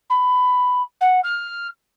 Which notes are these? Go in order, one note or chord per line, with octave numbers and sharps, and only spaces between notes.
B5
F#5
F6